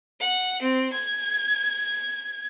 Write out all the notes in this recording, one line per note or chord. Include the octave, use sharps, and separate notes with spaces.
F#5
C4
G#6